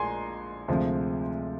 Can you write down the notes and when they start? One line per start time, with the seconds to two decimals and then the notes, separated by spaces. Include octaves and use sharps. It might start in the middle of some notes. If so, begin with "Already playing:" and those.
Already playing: A#1 G#3 G#5 A#5 C6
0.68 D2 C3 F3 G#3